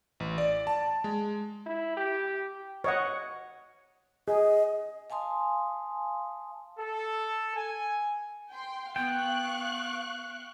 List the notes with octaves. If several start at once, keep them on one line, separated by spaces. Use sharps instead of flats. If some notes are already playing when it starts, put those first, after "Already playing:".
A1
D5
A5
G#3
E4
G4
C#5 D#5 F#5
G#4 D#5
F5 G#5 A5 C6 D#6
A4
G#5
G5 C6
B3 F5 G5 C#6 F#6